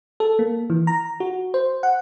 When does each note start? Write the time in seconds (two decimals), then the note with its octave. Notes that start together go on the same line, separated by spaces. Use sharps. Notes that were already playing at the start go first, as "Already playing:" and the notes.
0.20 A4
0.39 A#3
0.70 E3
0.87 A#5
1.20 F#4
1.54 C5
1.83 F#5